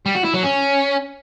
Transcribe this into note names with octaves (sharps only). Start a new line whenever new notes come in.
G3
F#4
E4
F#3
C#4